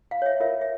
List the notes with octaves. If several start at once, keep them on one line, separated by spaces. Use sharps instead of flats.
F5
C#5
E5
F4 A#4 C#5 E5
E5